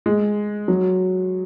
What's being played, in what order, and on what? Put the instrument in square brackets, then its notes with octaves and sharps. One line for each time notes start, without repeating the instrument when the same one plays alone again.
[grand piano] G#3
F#3